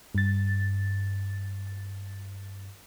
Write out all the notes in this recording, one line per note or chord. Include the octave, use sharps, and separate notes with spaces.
G2 A6